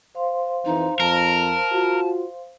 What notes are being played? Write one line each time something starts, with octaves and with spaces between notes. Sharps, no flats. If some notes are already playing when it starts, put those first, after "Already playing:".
C5 F5 C6
F2 E3 D#4
F2 A#4 A5
F4 F#4